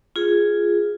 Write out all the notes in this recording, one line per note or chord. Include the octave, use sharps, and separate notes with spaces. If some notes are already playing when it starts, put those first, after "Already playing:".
F4 G#4